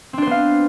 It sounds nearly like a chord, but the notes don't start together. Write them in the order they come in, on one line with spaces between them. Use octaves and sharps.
C4 D4 C5 B3 F5